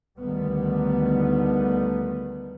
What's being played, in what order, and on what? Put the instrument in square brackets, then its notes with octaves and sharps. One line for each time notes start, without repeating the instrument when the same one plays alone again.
[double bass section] D2 D3 D#3 G3 B3